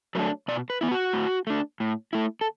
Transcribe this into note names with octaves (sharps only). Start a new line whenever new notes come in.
F#3 A3 D4 B4
B2 D5
B4
B3 E4
F#4
A2
A3 D4
A2
A3 E4
A4